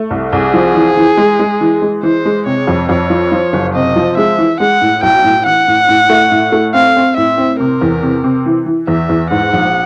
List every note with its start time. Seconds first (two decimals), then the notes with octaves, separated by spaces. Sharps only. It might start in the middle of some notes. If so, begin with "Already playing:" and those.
Already playing: A3
0.10 C2
0.32 C2 G#4
0.54 F3
0.75 E3
0.97 E3
1.17 G#3
1.39 G#3
1.61 E3
1.82 G#3
2.03 E3 C5
2.25 G#3
2.46 C3 C#5
2.67 F2
2.89 F2 C#5
3.10 F3
3.32 F3
3.53 F#1
3.74 C3 D#5
3.96 F3
4.17 G#3 E5
4.38 E3
4.60 G#3 F#5
4.81 A2
5.02 B1 G5
5.24 A2
5.46 E3 F#5
5.68 A2
5.89 A2
6.09 A3
6.31 A2
6.52 A3
6.74 C4 F5
6.96 C4
7.17 A2 E5
7.38 C4
7.59 C3 A#4
7.81 E2
8.03 C3
8.24 C3
8.46 E3
8.66 E3
8.87 E2 E5
9.09 E2
9.31 G#2 F#5
9.53 A#1